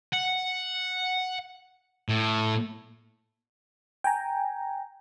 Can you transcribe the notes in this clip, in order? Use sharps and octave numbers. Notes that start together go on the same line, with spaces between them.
F#5
A2
G5 G#5 A#5